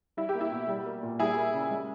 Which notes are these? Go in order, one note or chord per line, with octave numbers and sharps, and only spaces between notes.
G3 E4
G4
A#3
E4
B2
G3
A#3
A#2
G3 E4 G#4
A#3
C#3
G#3